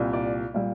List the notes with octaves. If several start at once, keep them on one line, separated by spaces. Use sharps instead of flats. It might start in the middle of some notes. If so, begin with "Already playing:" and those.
Already playing: C2 A#2 G3
D5
A#2 G3